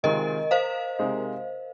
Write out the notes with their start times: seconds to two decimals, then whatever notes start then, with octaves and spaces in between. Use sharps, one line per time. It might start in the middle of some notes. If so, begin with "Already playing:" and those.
0.03 C3 D#3 G#3 C4 F4 A#4 D#5
0.51 C5 F5
0.99 C3 G#3 D#4